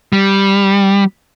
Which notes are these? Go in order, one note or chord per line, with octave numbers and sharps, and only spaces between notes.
G3